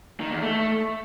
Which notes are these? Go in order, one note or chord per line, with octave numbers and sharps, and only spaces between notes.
D#3
E2
A3